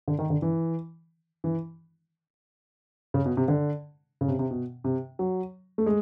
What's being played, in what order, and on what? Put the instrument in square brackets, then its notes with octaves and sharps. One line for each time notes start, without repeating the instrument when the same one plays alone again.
[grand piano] D3
D#3
D3
E3
E3
C#3
B2
C3
D3
C#3
C3
C3
B2
C3
F#3
A3
G#3